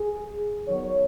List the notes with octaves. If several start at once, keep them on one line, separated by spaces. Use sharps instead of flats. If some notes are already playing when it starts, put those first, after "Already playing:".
Already playing: G#4
D#3 F#3 B3 C#5